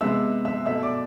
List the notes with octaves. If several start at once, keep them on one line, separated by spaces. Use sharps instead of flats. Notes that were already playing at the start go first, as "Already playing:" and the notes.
C3 G#3 B3 E5 E6
E5 E6
B2 A3 E5 E6
D5 D6